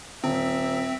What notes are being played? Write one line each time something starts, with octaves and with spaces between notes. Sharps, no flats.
D#1 C4 E5